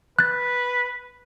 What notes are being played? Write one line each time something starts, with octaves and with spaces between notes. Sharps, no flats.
B4 F#6 G6 A6